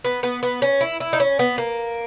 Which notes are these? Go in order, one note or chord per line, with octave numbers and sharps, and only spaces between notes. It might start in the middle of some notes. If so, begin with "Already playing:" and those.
B3
B3
B3
C#4
E4
E4
D#4
C#4
B3
A#3